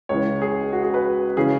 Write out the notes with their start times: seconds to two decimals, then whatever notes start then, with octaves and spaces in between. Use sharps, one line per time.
0.09 C#2 C#3 E3 C#5
0.42 G#4
0.73 F#4
0.83 G#4
0.94 B4
1.37 C#3 E3 C#4 G#4